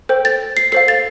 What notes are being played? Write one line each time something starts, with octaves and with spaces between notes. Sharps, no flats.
A4 C5 G5
A6
C7
A4 C5 F5 C7
A6